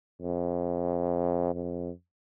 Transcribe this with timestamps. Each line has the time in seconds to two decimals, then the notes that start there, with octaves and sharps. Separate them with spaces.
0.22 F2
1.55 F2